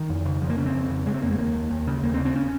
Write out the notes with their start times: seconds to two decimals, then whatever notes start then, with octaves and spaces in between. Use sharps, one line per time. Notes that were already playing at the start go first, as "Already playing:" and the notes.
Already playing: D#3
0.10 F2
0.26 C#3
0.41 F2 F3
0.50 A#3
0.58 C#3 C#4
0.66 C4
0.74 F2
0.90 C#3
1.06 C#3 G#3
1.14 C4
1.22 F2 A#3
1.31 G#3
1.38 D#2 A#3
1.55 D#2
1.71 D#2
1.87 C#3
2.03 D#2 A#3
2.14 C4
2.19 C#3
2.25 C4
2.36 C#4